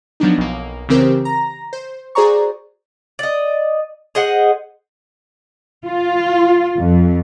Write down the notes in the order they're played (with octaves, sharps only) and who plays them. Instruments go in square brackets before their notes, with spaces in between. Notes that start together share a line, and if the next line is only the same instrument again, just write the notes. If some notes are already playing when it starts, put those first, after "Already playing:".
[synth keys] F3 F#3 B3 D4 D#4
B1 A#3
C#3 E3 C4 G4 A#4 C5
A#5 A#6
C5
F#4 G#4 C5 D5 A#5 C#6
[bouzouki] D5 D#5
G#4 C5 D#5 F#5
[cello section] F4
F2